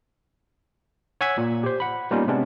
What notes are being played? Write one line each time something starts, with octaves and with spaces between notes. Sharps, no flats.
C#5 F#5 G#5 E6 G#6 B6
A#2
G4 C5
F#5 B5
G3 A#3 B3 C#4 D#4 F4
C3 G#3 B3 C#4 D4